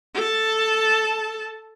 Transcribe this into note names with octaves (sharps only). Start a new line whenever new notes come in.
A4 A5